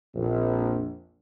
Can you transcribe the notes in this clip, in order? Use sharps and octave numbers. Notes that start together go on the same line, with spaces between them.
A#1 F2